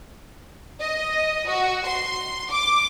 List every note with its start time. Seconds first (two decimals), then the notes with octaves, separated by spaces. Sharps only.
0.81 D#5
1.48 F#4
1.87 C6
2.51 D6